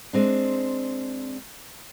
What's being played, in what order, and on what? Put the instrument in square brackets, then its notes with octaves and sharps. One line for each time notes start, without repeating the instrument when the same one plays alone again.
[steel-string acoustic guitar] G#3 C4 D4